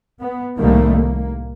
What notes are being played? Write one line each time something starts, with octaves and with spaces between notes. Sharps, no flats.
B3
C2 A2 D#3 G3 A3 A#3
A#3